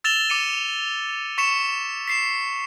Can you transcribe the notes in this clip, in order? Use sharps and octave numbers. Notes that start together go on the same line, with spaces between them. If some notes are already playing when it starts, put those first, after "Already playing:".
E6 A6 E7 F7 G7
D6 C#7 D#7
C#6 B6 C#7 E7
B6 C7 E7